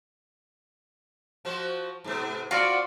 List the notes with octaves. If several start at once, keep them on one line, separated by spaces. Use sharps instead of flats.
F3 F#4 C5
G#2 C3 B3
C4 F4 F#4 D5